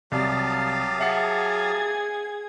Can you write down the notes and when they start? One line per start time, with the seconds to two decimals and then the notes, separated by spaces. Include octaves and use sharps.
0.12 C2 F#3 G4 F5 A5 D#6 A6
0.99 G#4 E5 F#5 G#6 C7